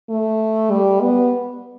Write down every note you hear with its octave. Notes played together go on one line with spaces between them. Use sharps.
A3
G3
B3